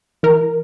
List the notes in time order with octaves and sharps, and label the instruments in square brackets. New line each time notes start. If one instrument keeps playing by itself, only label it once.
[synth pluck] E3 A#4